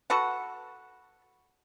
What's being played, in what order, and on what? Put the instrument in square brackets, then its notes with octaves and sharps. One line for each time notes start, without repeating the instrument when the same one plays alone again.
[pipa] F#4 A4 B4 F#5